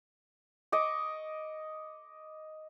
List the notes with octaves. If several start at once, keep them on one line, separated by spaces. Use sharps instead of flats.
D#5 C#6 D6